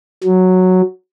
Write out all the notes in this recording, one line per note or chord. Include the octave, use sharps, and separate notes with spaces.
F#3